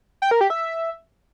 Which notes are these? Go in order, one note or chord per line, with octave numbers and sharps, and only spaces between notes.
G5
A#4
G4
E5